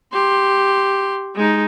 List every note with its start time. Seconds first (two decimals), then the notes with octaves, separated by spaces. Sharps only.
0.13 G4 C6
1.35 G#3 D#4